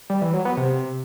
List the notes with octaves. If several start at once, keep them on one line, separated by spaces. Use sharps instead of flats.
G3
E3
F#3
B3
C3